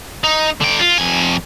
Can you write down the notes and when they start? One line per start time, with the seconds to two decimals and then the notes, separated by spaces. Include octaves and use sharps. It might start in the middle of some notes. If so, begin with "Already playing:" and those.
0.24 D#4
0.61 D3 G5
0.79 F4
0.98 F2 G#5